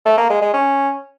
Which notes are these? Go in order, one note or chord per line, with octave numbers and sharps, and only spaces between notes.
A3
A#3
G#3
G#3
C#4